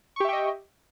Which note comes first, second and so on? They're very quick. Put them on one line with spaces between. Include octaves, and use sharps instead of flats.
C#6 G4 E5 G5 D#5